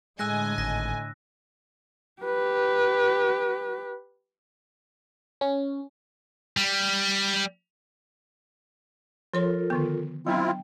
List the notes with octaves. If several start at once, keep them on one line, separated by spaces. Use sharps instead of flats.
A2 D3 G#3 D#5 G#5 E6 F#6 A#6
G#1 A#6
G4 B4
C#4
G3
F3 F4 A4 A#4 C#5 C6
D3 D#3 B3
F#3 B3 C4 D4 E4 F4 G5